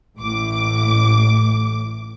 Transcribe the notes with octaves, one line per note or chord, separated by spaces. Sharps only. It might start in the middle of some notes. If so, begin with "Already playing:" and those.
A1 A2 D6